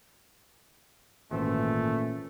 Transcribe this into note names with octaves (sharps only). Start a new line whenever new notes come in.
G#1 A#2 E3 A3 C#4 C5